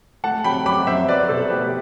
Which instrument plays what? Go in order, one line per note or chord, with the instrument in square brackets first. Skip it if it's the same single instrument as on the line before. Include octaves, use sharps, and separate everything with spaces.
[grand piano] A3 F#5 A5
F#3 G5 B5
F#2 B5 D6
F#2 C5 E5
F#3 B4 D5
B2 A4 C5
A3 G4 B4
B4